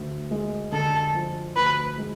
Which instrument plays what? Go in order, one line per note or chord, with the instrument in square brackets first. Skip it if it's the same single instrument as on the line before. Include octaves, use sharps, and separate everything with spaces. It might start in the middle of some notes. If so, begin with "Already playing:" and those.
Already playing: [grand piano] D2
G#3
[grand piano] D3 [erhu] A4
[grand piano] F3
[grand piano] D2 [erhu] B4
[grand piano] G#3